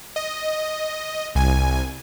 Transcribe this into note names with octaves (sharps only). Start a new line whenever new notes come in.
D#5
C2 G#5